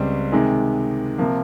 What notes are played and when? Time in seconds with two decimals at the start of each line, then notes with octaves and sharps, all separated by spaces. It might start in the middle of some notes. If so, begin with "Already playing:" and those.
Already playing: C#2 C#3 G3 C4
0.32 C3 D#3 G#3
1.18 C3 F3 A#3